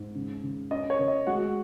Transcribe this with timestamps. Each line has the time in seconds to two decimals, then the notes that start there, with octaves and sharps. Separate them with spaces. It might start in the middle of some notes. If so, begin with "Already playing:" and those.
Already playing: G#2
0.15 C#3
0.43 C#3
0.71 C#4 D#5
0.90 C#5
0.99 C#3
1.08 D#5
1.27 G#3 F#4 F#5